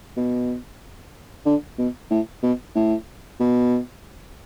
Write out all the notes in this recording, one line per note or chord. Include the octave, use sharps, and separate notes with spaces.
B2
D3
B2
A2
B2
A2
B2